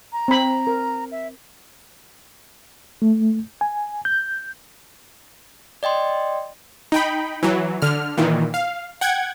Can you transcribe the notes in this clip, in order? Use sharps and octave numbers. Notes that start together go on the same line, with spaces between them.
A#5
C4 B5
A#4
E5
A3
G#5
G6
D5 D#5 G5 C6
D#4 G5 B5
E3 F#3
D3 F6
A#2 D#3 E3
F5
F#5 G5 G#6